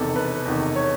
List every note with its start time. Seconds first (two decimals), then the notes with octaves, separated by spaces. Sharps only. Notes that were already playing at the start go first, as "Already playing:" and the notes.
Already playing: E1 E2 C3 D#3 A4
0.16 E1 B4
0.45 E2 C3 D#3
0.76 C#5